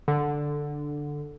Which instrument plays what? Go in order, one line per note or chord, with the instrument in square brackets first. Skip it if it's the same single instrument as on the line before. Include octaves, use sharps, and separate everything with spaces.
[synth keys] D3